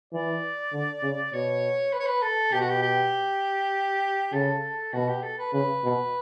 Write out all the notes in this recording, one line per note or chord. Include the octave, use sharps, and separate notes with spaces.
E3 D5
D3
C#3
B2 C#5
B4
C#5
B4
A4
B2 G4
F#4
G4
G4
C#3 A4
B2 F#4
G4
A4
B4
C#3 B4
B2